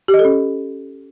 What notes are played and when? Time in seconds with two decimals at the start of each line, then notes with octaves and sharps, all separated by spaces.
0.08 G4
0.14 D#5
0.19 A4
0.25 C#4